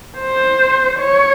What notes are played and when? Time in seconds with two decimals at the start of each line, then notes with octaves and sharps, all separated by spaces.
0.19 C5
1.00 C#5